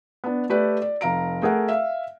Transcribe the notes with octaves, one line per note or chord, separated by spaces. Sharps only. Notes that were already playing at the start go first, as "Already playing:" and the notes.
B3 D4
A3 G4 A4 B4 D5
D5
F1 F5 A#5 D7
A3 G#4 A#4 F#5
E5 F5